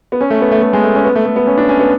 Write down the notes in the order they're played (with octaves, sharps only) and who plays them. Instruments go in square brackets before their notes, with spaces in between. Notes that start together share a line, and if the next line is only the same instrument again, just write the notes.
[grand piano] B3
C#4
A3
B3
A3
A3
G#3
A3
C#4
B3
A3
A3
B3
C#4
D4
C#4
B3